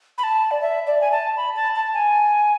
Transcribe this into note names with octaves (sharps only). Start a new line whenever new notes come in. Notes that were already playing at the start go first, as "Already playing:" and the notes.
B5
A5
D5
E5
D5
G#5
A5
B5
A5
A5
G#5